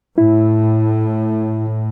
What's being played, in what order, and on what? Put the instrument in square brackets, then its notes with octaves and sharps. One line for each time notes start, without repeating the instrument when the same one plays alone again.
[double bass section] A2 [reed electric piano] E4